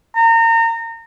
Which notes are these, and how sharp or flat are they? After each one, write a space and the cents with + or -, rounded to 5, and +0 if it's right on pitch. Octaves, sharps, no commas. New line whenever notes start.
A#5 -30